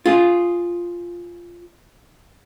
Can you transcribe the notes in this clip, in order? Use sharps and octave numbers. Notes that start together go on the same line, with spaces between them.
F4 G#4